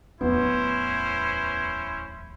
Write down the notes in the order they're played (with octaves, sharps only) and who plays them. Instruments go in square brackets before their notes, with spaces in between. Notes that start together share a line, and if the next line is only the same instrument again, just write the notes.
[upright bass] D1 E2 [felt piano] B3 [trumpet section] C#4 E4 C5